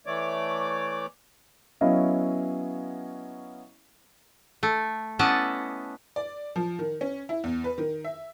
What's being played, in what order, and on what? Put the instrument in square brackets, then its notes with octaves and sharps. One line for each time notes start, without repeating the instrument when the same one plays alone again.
[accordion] E3 A3 C#5 D5 D6
[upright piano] F#3 B3 C#4 E4 D#5 F5
[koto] A3
B3 C#4 E4 D5 D#5 A5
[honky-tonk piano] D5
F3
D#3
C#4
E4
E2
B4
D#3
E5